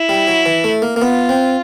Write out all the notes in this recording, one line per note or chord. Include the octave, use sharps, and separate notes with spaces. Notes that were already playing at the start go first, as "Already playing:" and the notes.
Already playing: E4
G3
F#3
E3
A3
A#3
A#3
B3 F4
C4